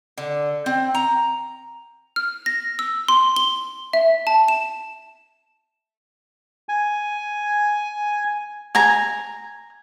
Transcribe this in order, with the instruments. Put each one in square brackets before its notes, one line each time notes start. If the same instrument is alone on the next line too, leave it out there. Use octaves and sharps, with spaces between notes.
[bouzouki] D3
C4
A#5
[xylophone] F6
A#6
E6
C6
G7
E5
A5
E7
[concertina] G#5
[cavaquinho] G#5 A#5